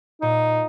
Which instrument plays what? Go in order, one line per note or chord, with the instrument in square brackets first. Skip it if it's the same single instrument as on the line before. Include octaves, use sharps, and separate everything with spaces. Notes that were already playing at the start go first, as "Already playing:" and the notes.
[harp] A#2 [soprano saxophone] D#4